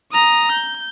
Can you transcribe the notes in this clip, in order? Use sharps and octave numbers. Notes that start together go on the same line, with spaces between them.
A#5 D#6
G6